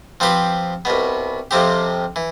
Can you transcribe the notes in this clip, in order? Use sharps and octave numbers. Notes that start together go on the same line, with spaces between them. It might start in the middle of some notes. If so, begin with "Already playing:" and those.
F3 C4 G4 B4
C2 B2 B3
F2 C3 F3 C4 G4
E3